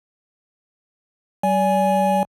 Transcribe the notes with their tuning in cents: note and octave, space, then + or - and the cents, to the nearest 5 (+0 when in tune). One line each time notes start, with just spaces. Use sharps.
G3 -35 D5 -30 G#5 +0